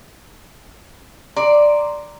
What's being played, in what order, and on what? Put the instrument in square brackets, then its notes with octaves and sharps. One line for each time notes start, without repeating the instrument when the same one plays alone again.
[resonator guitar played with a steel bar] D5 [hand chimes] A#5 C6